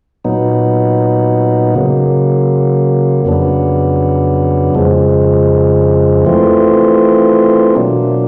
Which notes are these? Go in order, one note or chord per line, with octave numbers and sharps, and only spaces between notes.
A#2 F#3 B3 D#4
C#3 F#3 A#3
F2 C#3 F#3 B3 D4
F2 C#3 F3 G#3
E3 A3 C4 F4
B2 F#3 A#3 D4